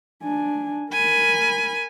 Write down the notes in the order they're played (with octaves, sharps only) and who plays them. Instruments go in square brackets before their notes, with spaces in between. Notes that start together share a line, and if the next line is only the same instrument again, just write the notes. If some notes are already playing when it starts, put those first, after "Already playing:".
[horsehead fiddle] D4 G#5
[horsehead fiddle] A#4 B5 [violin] G#5